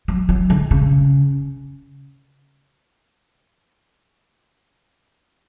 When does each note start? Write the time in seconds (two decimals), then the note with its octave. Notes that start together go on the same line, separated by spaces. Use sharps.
0.08 F#3
0.29 F#3
0.50 D3
0.71 C#3